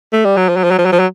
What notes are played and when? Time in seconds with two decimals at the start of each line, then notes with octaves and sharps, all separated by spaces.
0.13 A3
0.25 G3
0.37 F#3
0.49 F3
0.56 F#3
0.64 F3
0.71 F#3
0.78 F3
0.85 F#3
0.93 F3
0.99 F#3